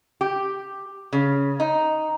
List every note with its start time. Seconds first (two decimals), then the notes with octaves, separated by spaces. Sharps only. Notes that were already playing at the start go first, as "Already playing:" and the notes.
0.21 G4
1.13 C#3
1.60 D#4